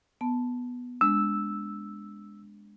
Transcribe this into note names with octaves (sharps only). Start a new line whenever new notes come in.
B3 A5
G#3 D4 E6